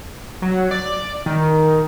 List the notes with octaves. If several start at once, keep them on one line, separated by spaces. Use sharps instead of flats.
F#3
D5
D#3